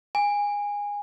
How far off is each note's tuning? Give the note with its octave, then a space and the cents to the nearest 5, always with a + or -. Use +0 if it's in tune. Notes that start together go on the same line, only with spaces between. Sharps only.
G#5 -20